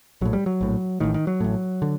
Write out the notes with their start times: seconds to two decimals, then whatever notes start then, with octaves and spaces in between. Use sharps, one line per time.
0.21 A#1 A2 F#3
0.33 G3
0.46 F#3
0.61 A#1 A2
1.00 A1 A2 D#3
1.14 D#3
1.27 F#3
1.40 A1 A2
1.82 D3